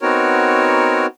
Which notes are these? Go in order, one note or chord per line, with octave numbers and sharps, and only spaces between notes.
B3 C4 D#4 F#4 A#4 C#5